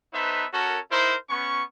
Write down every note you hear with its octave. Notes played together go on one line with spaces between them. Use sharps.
B3 D#4 A4 B4 C5 E5
C#4 F#4 A4 A#4
D#4 E4 A#4 C5
B3 C#4 C#6